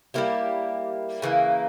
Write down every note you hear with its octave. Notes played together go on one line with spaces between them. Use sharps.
G3 A#3 E4 G4
C#3 E3 A#3